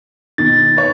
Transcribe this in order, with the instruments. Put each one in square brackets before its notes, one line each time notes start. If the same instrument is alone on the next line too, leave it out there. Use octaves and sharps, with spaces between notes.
[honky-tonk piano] B2 D#3 [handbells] A6
[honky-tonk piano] B4 C#5